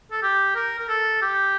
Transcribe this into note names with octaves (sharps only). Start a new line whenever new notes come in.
A4
G4
A#4
A#4
A4
G4